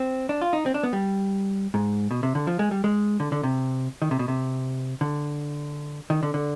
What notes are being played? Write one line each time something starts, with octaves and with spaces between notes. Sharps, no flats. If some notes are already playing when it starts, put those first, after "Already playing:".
Already playing: C4
D4
F4
D#4
C4
D4
B3
G3
G#2
B2
C3
D3
F3
G#3
G3
G#3
D3
D3
C3
D#3
C3
B2
C3
D3
D#3
D3
D3